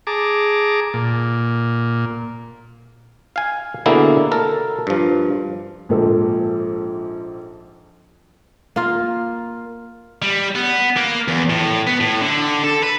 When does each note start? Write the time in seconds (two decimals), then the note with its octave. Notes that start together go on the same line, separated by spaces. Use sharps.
0.07 G#4 A5 A#5 D6
0.94 A#2
3.36 F5 G#5
3.86 B2 D3 A#3 E4 G#4
4.32 A4 A#4
4.87 G2 F3
5.89 A#1 G#2 F3 A4
8.76 A#3 F4
10.22 G3
10.55 B3
10.97 A#3
11.28 E2
11.50 A2
11.87 B3
12.01 A2
12.21 D3
12.64 A4
12.83 B4